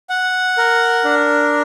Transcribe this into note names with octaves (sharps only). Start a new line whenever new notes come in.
F#5
A#4
D4